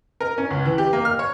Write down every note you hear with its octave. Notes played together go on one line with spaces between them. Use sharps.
A#4
C#4
C#2
E3
G4
A#3
F6
C#5